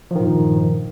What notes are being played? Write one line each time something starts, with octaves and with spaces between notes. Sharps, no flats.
G2 A#2 D#3 F3